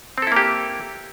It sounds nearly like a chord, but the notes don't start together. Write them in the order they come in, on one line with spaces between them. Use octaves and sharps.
C4 A4 E4 A#3 G4